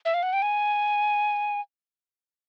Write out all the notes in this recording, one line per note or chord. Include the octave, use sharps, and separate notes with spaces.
E5
F5
F#5
G5
G#5